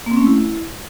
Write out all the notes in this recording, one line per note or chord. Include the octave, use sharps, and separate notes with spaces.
A#3
C4
C#4
A3
E4